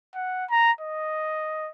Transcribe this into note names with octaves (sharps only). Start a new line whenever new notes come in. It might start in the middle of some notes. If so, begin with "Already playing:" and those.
F#5
A#5
D#5